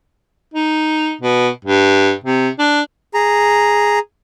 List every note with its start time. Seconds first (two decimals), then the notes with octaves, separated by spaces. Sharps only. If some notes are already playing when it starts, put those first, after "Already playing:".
0.54 D#4
1.21 B2
1.65 G2
2.24 C3
2.59 D4
3.14 G#4 A#5